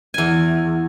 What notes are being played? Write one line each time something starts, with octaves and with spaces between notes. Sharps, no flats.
E2 G#5